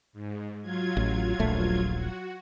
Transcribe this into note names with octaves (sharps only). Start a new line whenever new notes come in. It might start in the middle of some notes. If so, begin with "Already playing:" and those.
G#2
F#3 F4 G#6
A1
D#1 A#1 A3
F#4